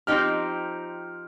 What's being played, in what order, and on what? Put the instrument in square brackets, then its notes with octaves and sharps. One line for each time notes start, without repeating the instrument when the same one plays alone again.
[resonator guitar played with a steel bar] F3 C4 D#4 G4 [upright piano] F6